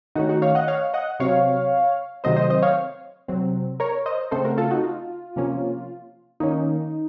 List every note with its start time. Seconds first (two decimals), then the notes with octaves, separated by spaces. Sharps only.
0.15 D#3 A3 C#4 D#4 F#4
0.29 D#4 F#4
0.42 C#5 F5
0.55 D#5 F#5
0.68 C#5 F5
0.94 D#5 F#5
1.20 C3 F#3 C4 C#5 F5
2.24 C3 D#3 F#3 A3 C4 C5 D#5
2.36 C5 D#5
2.50 C5 D#5
2.62 C#5 F5
3.28 C3 F#3 C4
3.80 A#4 C#5
4.06 C5 D#5
4.31 C#3 A3 C4 A4 C5
4.44 F#4 A#4
4.58 F4 A4
4.71 D#4 F#4
4.84 F4
5.36 C3 F3 A#3 C#4
6.40 D#3 A#3 C#4 D#4